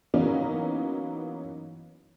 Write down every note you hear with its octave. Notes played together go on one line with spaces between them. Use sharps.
E3 F#3 A#3 B3 C#4 D#4